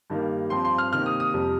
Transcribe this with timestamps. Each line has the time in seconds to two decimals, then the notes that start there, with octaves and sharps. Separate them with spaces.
0.10 G2 D#3 G3 A#3
0.50 G2 F3 C4 C6
0.65 C6
0.78 F6
0.93 C3 D#3 A#3 F6
1.06 D#6
1.20 D#6
1.34 F2 C3 G3